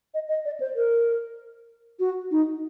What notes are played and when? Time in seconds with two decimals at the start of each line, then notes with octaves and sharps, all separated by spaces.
0.14 D#5
0.29 D#5
0.45 D5
0.60 C5
0.76 A#4
2.00 F#4
2.31 D#4